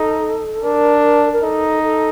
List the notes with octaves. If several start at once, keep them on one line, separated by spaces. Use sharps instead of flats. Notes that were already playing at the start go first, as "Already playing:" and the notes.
Already playing: D#4 A4
D4 A#4
A#4
D#4 A4
A4